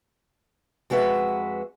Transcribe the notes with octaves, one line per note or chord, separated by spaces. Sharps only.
F2 G#3 F#4 B4 E5